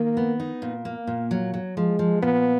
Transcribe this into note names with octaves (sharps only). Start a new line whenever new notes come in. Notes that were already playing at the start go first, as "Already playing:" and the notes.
Already playing: D#3 A#3
B3
D#4
A#2
A#3
A#2
F#3
F#3
F3 G#3
F3
A#2 B3